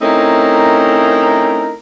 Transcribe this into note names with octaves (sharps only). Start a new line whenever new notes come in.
A3 C4 C#4 D#4 E4 A#4